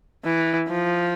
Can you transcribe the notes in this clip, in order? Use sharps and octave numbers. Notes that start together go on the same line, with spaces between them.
E3
F3